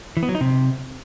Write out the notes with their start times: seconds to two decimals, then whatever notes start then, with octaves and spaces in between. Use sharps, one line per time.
0.17 E3
0.23 B3
0.29 F#3
0.35 D#4
0.41 C3